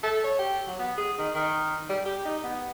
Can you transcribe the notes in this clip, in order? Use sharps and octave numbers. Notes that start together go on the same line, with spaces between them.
A4
C#5
G4
F#3
B3
G#4
D#3
D#3
G3
G4
D#4
B3